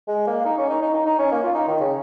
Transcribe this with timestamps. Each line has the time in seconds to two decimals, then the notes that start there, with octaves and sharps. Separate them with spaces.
0.08 G#3
0.27 A#3
0.46 D#4
0.58 C#4
0.70 D#4
0.82 D#4
0.94 D#4
1.07 D#4
1.19 C#4
1.32 A#3
1.43 F4
1.55 D#4
1.68 D#3
1.81 C#3